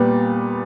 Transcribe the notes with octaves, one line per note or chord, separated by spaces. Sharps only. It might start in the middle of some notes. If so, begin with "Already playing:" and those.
Already playing: A#2 G3 B3